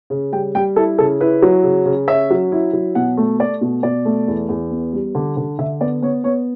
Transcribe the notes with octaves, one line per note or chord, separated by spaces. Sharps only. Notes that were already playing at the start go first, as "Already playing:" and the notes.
C#3
G3 G5
G3 G5
E4 A4
C#3 A4
E4 B4
F#3
C#3
C#3
C#4 E5
F#3
E4
F#3
B2 F#5
A3
A3 D5
B2
B2 D5
A3
E2
E2
B3
G3
D3
D3
D3 E5
B3 D5
B3 C#5
B3 C#5